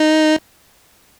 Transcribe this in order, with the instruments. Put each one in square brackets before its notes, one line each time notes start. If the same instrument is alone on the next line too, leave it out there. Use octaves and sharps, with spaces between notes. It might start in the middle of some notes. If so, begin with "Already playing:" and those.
Already playing: [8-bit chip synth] D#4